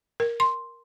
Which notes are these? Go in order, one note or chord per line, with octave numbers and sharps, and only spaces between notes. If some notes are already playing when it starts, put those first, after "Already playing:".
A#4
C6